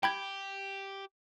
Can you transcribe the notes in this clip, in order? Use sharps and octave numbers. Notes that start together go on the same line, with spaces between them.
G4 G5 B5 G#6